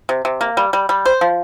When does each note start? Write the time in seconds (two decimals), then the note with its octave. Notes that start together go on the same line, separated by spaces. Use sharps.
0.09 C3
0.25 C3
0.41 A#3
0.57 G3
0.73 G3
0.89 G3
1.05 C5
1.21 F3